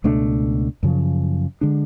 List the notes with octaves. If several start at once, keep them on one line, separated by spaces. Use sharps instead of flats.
C#2 B2 A3 D4
F#2 C#3 F3
D3 G#3 D4